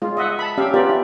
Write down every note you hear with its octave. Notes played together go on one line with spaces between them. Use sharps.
G#3 F4
D#5 E5 F#5
A5 B5
C#4 G4 E5 F5
B3 C#4 F4 G4 A#4 D5
E4